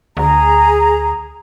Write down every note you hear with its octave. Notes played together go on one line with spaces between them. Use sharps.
D2 G#4 A#5